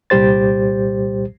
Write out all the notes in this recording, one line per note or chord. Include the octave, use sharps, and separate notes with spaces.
C2 A#2 G3 G4 C5 A6